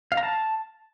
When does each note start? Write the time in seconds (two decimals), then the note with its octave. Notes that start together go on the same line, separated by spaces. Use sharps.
0.12 F5
0.17 A#5
0.23 A5